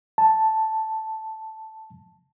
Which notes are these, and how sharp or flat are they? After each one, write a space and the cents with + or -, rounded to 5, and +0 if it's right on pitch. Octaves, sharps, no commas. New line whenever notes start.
A5 +0